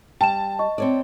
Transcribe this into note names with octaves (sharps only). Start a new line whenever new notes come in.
G3 G5 A5 E7
D#5 C#6
C4 C#5 D5